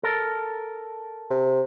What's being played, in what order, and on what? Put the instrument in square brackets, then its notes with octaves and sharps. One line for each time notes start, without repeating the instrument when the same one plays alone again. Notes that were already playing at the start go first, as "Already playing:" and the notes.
[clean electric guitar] A4 A#4
[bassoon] C3